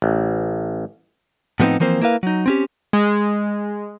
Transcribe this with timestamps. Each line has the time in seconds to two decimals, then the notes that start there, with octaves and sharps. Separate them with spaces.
0.02 A1
1.60 A2 F3 G#3 B3 C4 D#4
1.80 E3 F3 A#3 C4 C5
2.02 A#3 E4 A#4 B4 F5
2.23 F#3 D#4
2.46 C4 C#4 G4
2.93 G#3